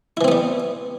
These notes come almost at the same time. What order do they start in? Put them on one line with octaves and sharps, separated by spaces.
E4 E3 C4 B3 G3